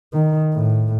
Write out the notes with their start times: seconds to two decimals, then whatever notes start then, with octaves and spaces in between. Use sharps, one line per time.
0.14 D#3
0.54 A2